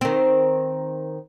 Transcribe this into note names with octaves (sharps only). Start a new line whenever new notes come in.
D#3 C4